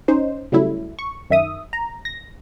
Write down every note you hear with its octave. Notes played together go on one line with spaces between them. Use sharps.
C#4 D#4 C5
C#3 F#3 G3 A3 E4
C#6
F#2 D#3 E5 D#6
A#5
A#6